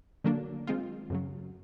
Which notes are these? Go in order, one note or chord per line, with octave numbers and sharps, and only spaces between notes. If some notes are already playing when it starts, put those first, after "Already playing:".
D3 F#3 A#3 D4
D#3 G#3 C4 F4
F#2 C#3 F#3